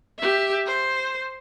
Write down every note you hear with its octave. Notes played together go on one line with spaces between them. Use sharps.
G4 E5
C5